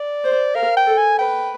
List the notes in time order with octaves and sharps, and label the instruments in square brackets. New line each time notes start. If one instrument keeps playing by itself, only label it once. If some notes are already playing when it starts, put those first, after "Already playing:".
Already playing: [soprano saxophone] D5
[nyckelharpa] C5
[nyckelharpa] A#4 [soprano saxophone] F5
[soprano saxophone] G5
[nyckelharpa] A4
[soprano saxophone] G#5
[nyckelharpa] B4 [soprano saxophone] G5